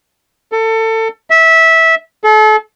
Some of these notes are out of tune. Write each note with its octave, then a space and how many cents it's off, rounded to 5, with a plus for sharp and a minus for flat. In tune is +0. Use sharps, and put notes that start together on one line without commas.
A4 +25
E5 -15
A4 -35